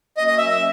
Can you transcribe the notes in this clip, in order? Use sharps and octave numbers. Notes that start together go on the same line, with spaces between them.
F#3 A#3 C#4 D#5
D#5
E5
E5